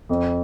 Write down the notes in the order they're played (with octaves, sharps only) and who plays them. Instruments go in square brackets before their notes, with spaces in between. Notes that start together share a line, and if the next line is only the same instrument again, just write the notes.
[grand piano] F2